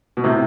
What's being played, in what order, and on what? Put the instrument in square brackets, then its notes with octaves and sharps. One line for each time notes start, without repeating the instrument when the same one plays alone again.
[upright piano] B2
A2 C3